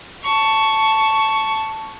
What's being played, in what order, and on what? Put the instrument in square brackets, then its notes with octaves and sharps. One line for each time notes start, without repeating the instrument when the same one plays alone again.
[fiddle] A5 C#6